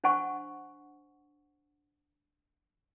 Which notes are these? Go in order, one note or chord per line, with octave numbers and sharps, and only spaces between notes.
D4 C5 F#5 G#5 C#6